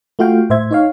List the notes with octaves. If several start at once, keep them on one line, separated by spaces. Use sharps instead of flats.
A3 F4 F#4 F5 G5
A2 C5 E5 G#6
D#4 C#5 F5